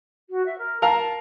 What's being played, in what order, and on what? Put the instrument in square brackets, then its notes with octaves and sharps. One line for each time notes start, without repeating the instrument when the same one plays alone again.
[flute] F#4
E5
A#4
[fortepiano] A#4 F5 A#5 [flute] A5